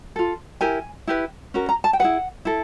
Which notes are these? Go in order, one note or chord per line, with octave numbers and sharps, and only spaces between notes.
F4 A4
E4 G4 A#4 G#5
E4 G4 B4
C#4 F#4 A#4
A#5
A5
G5
E4 G#4 B4 F#5
E4 A4